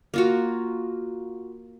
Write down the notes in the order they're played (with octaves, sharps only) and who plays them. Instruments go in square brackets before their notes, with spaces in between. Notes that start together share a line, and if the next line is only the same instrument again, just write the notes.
[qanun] A#3 F4 F#4